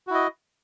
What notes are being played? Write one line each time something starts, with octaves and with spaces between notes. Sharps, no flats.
E4 F#4 D#5